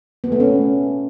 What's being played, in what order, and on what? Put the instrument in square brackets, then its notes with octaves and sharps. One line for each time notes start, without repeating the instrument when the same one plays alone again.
[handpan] B3
A3
C#4